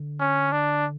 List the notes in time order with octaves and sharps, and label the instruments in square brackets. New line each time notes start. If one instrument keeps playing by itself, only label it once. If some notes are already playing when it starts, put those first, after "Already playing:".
Already playing: [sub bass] D3
[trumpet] C#4
D4